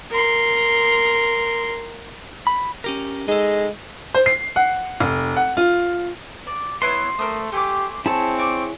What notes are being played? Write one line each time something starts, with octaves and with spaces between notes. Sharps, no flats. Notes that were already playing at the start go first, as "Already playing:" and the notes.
A#4 C6
B5
C#4 G4 A#4
G#3 D#4 A4
C5
C7
F#5
F1
F#5
F4
D5
B3 E4 C#5 C6
A3 A#4 C5 D#6
A3 G4 G#5 D6
C4 E4 G#4 C#5 A5
D5 C#6 D6